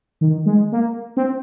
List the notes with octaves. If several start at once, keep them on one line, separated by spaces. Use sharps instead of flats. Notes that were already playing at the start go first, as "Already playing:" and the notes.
D#3
G#3
A#3
C4